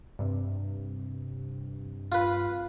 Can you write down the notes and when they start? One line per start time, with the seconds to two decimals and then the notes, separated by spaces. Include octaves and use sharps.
0.19 G2 C3
2.12 F4 B4